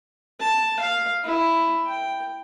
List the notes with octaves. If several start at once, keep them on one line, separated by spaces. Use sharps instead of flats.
A5
F5
E4
G5